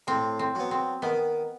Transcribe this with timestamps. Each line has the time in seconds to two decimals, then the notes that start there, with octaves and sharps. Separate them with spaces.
0.07 A2 C4
0.39 C4
0.55 F#3 B3
0.71 C4
1.02 D#3 B3